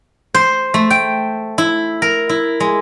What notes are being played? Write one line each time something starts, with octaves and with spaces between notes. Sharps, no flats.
C5
A3
G5
E4
A#4
E4
G#3